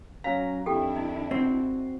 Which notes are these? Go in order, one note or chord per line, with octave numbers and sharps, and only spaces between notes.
F#3 C#4 F5 A#5
F2 D#3 D4 E4 G4 A4 G5
D#4
C4 F#4